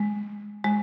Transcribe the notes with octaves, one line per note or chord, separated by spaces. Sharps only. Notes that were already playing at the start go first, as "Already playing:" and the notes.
Already playing: G#3
G#3